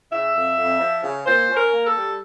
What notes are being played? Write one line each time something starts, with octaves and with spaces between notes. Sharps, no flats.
C#3 E5
F2
F2
F3
C#3
A#2 C5
C#4
A#4
A#3
A4
G3